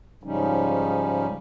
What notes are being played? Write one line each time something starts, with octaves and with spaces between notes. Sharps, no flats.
G#2 C#3 F3 G3 C#4 D#4